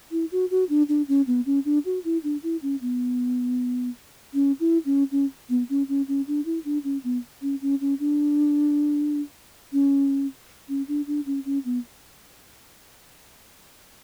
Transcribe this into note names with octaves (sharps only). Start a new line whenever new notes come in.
E4
F#4
F#4
D4
D4
C#4
B3
C#4
D4
F#4
E4
D4
E4
C#4
B3
C#4
E4
C#4
C#4
B3
C#4
C#4
C#4
D4
E4
D4
C#4
B3
C#4
C#4
C#4
D4
C#4
C#4
D4
D4
C#4
C#4
B3